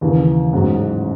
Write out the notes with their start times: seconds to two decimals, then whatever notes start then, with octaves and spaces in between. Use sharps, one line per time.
0.01 D#2 C#3 E3
0.53 A1 G#2 F#3